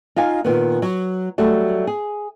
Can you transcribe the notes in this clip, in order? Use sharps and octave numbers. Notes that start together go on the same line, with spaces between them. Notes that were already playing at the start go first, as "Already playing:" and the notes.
D#4 F4 F5 G#5
A#2 D#3 B3
F#3
F#3 G3 A3 F#4
G#4